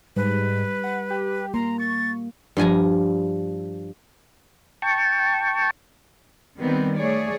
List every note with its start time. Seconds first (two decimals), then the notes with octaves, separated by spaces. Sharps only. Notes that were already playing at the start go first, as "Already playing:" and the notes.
0.17 G#2 G3 B4
0.84 F#5
1.10 G4
1.54 A#3 A#5 C6
1.80 C#6 A6
2.57 G2 F3 G#5 A#5
4.82 G5 A5 C#6
6.58 D#3 G3 B3 C4
6.98 A3 G#4 C#5 D5